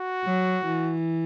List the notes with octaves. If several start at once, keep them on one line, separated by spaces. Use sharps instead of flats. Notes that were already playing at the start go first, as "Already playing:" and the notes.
Already playing: F#4
F#3
E3